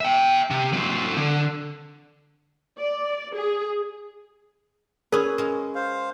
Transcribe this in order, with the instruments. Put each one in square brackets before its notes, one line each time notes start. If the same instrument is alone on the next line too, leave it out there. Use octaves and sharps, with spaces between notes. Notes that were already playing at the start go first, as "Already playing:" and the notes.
[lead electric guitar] E5 G5
C3
F#3 C4
D3
[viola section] D5
G#4
[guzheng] C#4 B4 [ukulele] G#4 [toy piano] A#4
[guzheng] G#3 C#4
[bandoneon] C5 F5